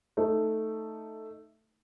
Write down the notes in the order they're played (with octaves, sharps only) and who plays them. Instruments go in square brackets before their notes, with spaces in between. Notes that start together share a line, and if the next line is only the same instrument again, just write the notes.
[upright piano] A3 D#4